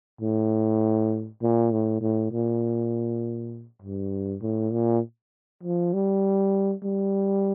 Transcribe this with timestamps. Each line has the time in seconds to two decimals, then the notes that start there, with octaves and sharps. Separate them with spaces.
0.21 A2
1.42 A#2
1.72 A2
2.01 A2
2.32 A#2
3.82 G2
4.42 A2
4.72 A#2
5.63 F3
5.93 G3
6.83 G3